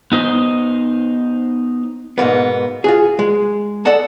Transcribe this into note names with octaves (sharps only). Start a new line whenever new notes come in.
B3 D#4 C5
G#2 B2 A#3 B3
F4 F#4 G#4
G#3
A4 D5 D#5 F#5 A5